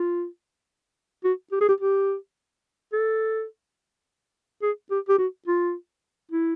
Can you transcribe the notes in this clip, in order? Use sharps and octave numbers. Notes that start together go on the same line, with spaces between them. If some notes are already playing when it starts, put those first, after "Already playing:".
Already playing: F4
F#4
G4
G#4
G4
G4
A4
G#4
G4
G4
F#4
F4
E4